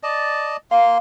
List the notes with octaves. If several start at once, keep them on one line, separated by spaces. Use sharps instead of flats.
D5 D#5 A5
A#3 F5 C6